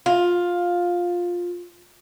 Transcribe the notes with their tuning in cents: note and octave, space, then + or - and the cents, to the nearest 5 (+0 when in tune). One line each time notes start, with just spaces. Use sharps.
F4 +10